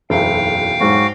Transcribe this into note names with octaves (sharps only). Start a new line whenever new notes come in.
F#1 B1 E2 A3 F5 G5
G#2 F#3 F#4